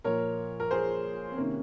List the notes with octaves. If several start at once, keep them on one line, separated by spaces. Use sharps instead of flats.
A#2 F3 A#4 C#5
A#4
G#4 C5
C4
C3 D#3 A#3 C#4